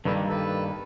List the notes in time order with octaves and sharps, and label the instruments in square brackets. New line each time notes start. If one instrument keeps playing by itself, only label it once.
[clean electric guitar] G2 D#3 G3 A#3 [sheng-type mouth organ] A4 B4
[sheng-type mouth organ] A4 B4